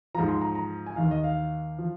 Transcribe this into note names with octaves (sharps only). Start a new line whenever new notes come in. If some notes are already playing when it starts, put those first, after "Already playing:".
G#2 F3 A#5
C6
A#5
A#5
G#5
D#2 D#3 F5
D#5
F5
F3